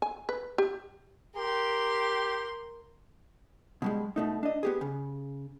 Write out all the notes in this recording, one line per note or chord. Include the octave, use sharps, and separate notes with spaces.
G#5
B4
G4
G4 A#4 C6
B2 G3 G#3
B2 A3 D#4
D4 D#5
B3 G4 G#4
C#3